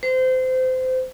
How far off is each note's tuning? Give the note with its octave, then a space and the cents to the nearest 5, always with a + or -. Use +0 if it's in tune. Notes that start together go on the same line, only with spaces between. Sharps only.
C5 -25